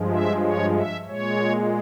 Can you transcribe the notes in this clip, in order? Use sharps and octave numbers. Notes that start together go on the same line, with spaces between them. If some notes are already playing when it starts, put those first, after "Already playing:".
Already playing: G2 F3 G#3
E5
C#5
E5
A#2 G#3 C#5